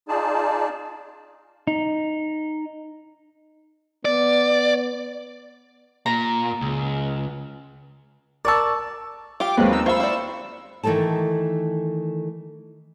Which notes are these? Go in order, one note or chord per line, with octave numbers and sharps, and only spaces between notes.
D#4 F4 G#4 D5 A5
D#4
B3 D5
A#2 A#5
C#2
A#4 D5 A5 C#6 E6
F4 G4 D6
D#2 F#3 G#3 A#3 C4 B4
D#4 E6
F4 C5 F5 B5 C#6 E6
E4 D5
D#3 E3 A3 D#4 A4 A5